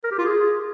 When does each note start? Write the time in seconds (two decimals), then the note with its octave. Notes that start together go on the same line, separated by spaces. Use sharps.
0.04 A#4
0.11 G4
0.18 F4
0.26 G#4